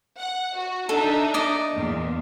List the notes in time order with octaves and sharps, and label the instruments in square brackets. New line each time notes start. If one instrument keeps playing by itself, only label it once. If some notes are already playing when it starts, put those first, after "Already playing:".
[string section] F#5
F#4
[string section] D4 D#4 E5 [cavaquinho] A4
[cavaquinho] D5 D#5
[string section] E2 A#2